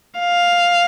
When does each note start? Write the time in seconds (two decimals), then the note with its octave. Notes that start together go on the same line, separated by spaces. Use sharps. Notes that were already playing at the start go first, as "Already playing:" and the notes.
0.20 F5